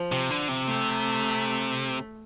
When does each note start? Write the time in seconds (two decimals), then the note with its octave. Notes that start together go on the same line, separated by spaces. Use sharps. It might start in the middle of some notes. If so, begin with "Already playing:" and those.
Already playing: F3
0.12 C3
0.30 D3
0.49 C3
0.67 A3